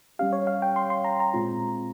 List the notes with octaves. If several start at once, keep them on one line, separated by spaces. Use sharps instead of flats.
G3 C#4 G4 F5
C#5
F5
G5
C6
C6
A#5
A#5
A#2 G#3 C4 F4